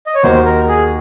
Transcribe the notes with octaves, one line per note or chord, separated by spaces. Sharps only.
D#5
C#5
D#2 D#3 A#3 D#4 F#4 C5
A#4
G#4